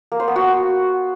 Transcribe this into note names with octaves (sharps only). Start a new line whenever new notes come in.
A#3
C5
B3
F#4